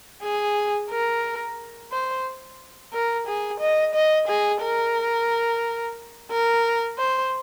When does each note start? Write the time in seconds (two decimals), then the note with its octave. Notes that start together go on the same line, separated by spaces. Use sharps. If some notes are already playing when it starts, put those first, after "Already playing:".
0.23 G#4
0.90 A#4
1.92 C5
2.93 A#4
3.27 G#4
3.60 D#5
3.94 D#5
4.28 G#4
4.62 A#4
6.31 A#4
6.98 C5